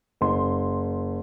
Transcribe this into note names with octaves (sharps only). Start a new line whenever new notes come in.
F#1 C6